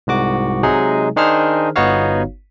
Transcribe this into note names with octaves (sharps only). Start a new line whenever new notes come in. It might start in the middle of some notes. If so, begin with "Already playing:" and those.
C2 G#2 F#4 D6
C3 F#3 G#3 D#4 G#4
D#3 D4 D#4 G#4 C5 F6
G1 B3 D#4 F#4 C#5 F5